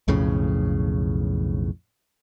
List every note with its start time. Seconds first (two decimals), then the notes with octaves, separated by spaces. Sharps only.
0.08 B1 F2 A2 C#3